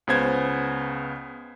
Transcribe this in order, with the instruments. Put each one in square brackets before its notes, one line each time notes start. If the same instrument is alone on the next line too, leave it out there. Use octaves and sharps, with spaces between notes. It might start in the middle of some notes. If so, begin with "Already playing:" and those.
[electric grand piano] C#2 C#3 B3 C5 G#6